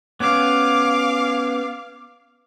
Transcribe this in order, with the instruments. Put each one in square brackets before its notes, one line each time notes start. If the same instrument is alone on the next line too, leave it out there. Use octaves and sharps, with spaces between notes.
[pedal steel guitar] B3 C#4 [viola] F5 D6